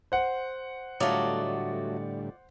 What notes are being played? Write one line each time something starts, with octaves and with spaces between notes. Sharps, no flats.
C5 F#5
A2 D3 F#3 G3 A3 F4 D5 D#5